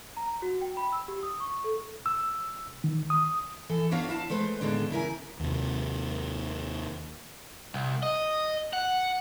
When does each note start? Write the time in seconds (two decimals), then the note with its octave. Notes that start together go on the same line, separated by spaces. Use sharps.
0.17 A#5
0.42 F#4
0.61 G5
0.77 B5
0.92 E6
1.08 G4
1.23 D#6
1.40 C#6
1.64 A4
2.06 E6
2.84 D#3
3.10 D#6
3.69 E3 A4 G#5
3.91 B3 D4 F#4 C#5 F5
4.09 E4 F5 A5
4.30 G#3 A3 B4 C5
4.61 D#2 A2 D3 G#3 B3 D4
4.90 C#3 E4 A#4 G#5
5.40 D#2 C3
7.74 C2
8.03 D#5
8.73 F#5